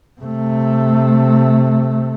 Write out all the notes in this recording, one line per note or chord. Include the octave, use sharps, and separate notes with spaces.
C3 A3